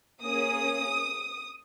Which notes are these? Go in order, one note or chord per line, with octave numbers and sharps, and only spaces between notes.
A#3 C#4 G#4 D#6